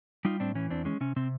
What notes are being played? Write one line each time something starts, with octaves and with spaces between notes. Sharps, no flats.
G3 D#4 F4
A2 C4 D4
E3 C#4
E2 C4 D4
G#3 C#4
C3 C#4
C3 C4